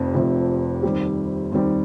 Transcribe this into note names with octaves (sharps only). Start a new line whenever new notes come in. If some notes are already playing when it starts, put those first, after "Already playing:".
Already playing: F1 F2 C3 F3
F1 F2 C3 F3
D#2 D#3 G3 C4 G4
D#2 D#3 G3 C4 G4